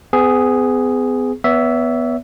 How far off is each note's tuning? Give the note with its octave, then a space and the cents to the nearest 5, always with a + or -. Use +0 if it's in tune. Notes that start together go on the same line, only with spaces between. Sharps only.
B3 +40 G#4 +0
B3 +0 C#5 +45 E5 +0